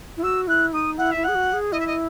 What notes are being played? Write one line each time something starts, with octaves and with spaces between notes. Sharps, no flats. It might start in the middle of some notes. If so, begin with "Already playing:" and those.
E4
F#4 E6
E4 F#6
D#4 D#6
E4 F#5
E5
E4
G#4 F#5
F#4
G#4
E4 D#5
E5
D#5